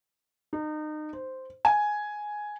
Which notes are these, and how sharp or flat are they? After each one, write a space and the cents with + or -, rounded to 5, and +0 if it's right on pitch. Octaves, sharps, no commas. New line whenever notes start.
D#4 -30
C5 -5
G#5 +5